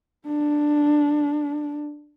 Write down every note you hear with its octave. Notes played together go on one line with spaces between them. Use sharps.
D4